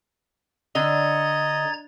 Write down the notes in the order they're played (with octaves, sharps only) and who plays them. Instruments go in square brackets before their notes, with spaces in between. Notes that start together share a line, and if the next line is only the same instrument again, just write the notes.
[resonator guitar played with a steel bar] D3 [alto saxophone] D#5 [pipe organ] A#5 G#6 A6